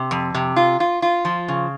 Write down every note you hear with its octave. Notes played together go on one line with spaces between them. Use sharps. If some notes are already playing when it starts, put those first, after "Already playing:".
Already playing: C3
F2
C3
F4
F4
F4
F3
C#3